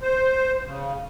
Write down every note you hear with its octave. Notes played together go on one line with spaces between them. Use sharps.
C5
C#3